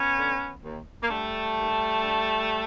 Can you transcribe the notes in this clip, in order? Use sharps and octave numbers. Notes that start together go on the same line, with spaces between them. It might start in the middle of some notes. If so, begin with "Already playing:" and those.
Already playing: B3 C#4
D3
D#2
A#3
D3 G3 A3
D#2
D3